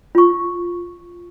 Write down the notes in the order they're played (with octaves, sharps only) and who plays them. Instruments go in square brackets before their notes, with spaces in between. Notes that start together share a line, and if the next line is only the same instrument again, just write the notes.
[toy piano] F4 C#6